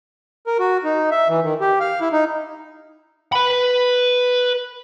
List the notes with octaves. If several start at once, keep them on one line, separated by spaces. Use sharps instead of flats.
A#4
F#4
D#4
E5
E3
D#3
G4
F5
E4
D#4
B4 B5